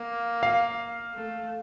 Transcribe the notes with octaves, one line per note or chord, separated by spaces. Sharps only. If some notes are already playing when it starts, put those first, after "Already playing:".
Already playing: A#3
F5
A3